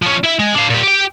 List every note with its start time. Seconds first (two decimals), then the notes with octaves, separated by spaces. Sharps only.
0.02 F3 C#4
0.24 E4 E5
0.39 G#3
0.55 D4 F5
0.70 A#2 G4
0.84 G4 G5